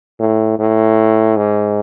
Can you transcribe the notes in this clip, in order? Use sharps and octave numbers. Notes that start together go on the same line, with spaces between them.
A2
A2
G#2